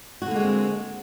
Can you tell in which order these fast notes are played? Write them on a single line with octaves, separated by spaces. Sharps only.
F#4 D3 A#3 G#3 C4